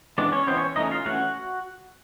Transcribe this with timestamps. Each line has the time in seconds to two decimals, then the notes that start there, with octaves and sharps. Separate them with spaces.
0.18 E3 G#3 B3 D4 D5
0.32 C#4 C#5
0.47 E3 G#3 B3 C4 C5
0.57 C#4 C#5
0.76 E3 A3 C#4 D#4 D#5
0.91 F4 F5
1.06 E3 A3 C#4 F#4 F#5